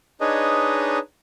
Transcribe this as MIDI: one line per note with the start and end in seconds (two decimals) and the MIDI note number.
0.21 0.99 62
0.21 0.99 63
0.21 0.99 68
0.21 0.99 71
0.21 0.99 73
0.21 0.99 75